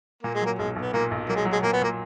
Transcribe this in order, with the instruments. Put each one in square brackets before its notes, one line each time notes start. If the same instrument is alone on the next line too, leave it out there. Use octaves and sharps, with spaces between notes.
[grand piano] A#2 [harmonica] A#3
[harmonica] G#3
[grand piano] F#3 [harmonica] A#3
[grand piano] B1 [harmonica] G#3
[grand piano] B1
[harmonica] B3
[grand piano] A#2 [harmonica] A#3
[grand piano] B1
[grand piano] F#3 [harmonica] A#3
[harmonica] G#3
[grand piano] F#3
[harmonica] G#3
[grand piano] A#2 [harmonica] A#3
[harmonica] B3
[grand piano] A#2 [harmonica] A#3